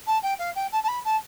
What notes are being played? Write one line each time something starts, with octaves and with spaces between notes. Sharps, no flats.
A5
G5
F5
G5
A5
A5
B5
A5